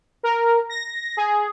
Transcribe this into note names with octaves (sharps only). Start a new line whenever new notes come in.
A#4
A#6
G#4